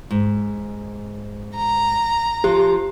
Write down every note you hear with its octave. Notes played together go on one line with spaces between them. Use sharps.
G#2
A#5
F3 G4